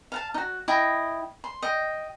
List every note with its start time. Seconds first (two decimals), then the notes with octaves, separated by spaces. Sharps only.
0.12 F5 F#5 A5
0.34 D#4 F#4
0.68 E4 D#5 G5 D#6
1.44 C6
1.62 D#5 G5